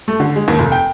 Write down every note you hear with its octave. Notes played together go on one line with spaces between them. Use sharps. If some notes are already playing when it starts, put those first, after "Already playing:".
A3
D3
G#3
D#2
F1
G5